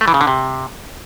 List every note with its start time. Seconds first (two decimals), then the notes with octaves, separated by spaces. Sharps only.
0.01 A3
0.08 E3
0.14 C#3
0.21 D3
0.27 C3